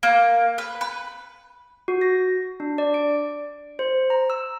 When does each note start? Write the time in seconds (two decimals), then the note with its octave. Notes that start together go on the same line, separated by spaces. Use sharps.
0.03 A#3
0.58 B4
0.81 B4
1.88 F#4
2.01 A#6
2.60 D4
2.78 D5
2.94 D7
3.79 C5
4.10 A#5
4.30 E6